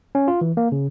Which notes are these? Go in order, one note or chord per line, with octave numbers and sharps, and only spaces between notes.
C#4
F4
E3
A#3
C#3